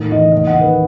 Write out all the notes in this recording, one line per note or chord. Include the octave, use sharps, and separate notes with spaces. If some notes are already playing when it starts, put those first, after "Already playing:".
Already playing: A2 D#3
E3 D#5
D#2 D#5
F#5
D#3
B4